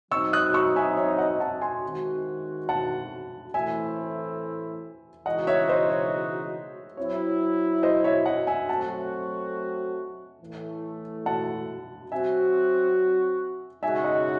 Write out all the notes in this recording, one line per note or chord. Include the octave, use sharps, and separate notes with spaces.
F#3 C4 D#4 F#4 C#6 E6
D#6 F#6
C#6 E6
E5 G#5
C#5 E5
D#5 F#5
F#5 A5
G#5 C6
D#3 G#3 C4 F#4
F#5 A5
A2 E3 A3 C4 E4 E5 G#5
C#3 E3 G#3 D#4 F#4 D#5 F#5
C#5 E5
C5 D#5
C#5
F#3 C4 E4 C#5
C5 D#5
C#5 E5
D#5 F#5
E5 G#5
F#3 A3 C4 F#4 F#5 A5
A2 E3 A3
F#5 A5
F#3 C4 F#4 E5 G#5
C#3 G#3 D#4 F#4 E5 G#5
D#5 F#5